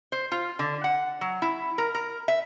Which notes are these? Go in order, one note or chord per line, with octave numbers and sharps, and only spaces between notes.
C5
F4
D3
F#5
F#3
E4
A#4
A#4
E5